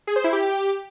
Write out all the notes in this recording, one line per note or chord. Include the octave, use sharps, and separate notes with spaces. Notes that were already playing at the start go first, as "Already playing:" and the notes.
G#4
C5
E4
G4